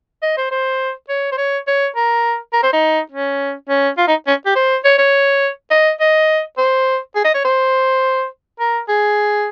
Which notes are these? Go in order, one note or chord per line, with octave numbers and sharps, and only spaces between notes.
D#5
C5
C5
C#5
C5
C#5
C#5
A#4
A#4
C5
D#4
C#4
C#4
F4
D#4
C#4
G4
C5
C#5
C#5
D#5
D#5
C5
G#4
D#5
C#5
C5
A#4
G#4